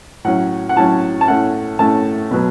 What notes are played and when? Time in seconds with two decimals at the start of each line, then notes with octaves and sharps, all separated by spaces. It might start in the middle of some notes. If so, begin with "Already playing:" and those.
0.25 A2 F#3 C#4 F#5
0.69 F#5
0.76 A2 F#3 C#4 A5
1.21 A5
1.28 A2 A3 C#4 F#5
1.79 A2 A3 C#4 A5
2.31 B2 F#3 B3